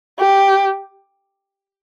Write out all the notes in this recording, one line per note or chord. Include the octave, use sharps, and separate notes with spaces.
G4